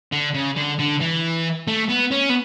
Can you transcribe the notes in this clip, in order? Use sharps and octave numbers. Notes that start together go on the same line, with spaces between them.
D3
C#3
D3
D3
E3
A3
B3
C#4
B3